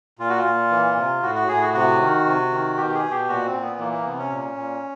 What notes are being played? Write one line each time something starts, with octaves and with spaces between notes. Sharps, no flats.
A#2 F4
F#4
F4
A#2
E3
C3
A2 F#4
F#4
A2 G#4
F#4
C3 F#4
D#3
C3
D#3
B2 G4
G#4
B2
G4
A#2 F#4
C4
A#2
B3
E3 A#3
A#3
C3 B3
C#4
A#2
A#2